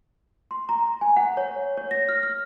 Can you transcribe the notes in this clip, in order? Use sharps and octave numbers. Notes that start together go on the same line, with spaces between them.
C6
A#5
G#5
F#5
C#5
C#5
A#6
F6
F6